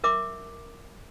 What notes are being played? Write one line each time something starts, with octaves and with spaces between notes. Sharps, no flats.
A#4 E5 D6